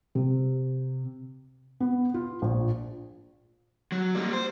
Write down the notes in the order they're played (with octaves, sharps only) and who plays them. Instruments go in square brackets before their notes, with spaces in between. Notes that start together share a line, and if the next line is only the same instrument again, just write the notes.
[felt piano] C3
B3
F4
A#1
[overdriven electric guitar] F#3
G3 A#3
C5